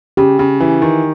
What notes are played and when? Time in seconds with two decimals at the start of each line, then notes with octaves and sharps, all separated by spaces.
0.17 C#3 G4
0.39 C#3
0.60 E3
0.82 D#3